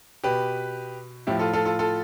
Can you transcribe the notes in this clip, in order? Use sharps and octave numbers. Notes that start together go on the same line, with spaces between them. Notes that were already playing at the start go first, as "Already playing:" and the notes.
B2 G4 B4
A2 F3 E4 G4
F4 A4
F4 A4
F4 A4
F4 A4